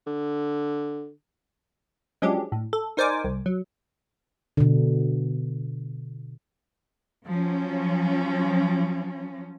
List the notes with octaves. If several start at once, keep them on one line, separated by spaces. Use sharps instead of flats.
D3
F3 F#3 G#3 C#4 D4 G4
A2
A4
D#4 A#4 C5 D5 G#5 D6
C2
F#3
B2 D3
F3 F#3 C#4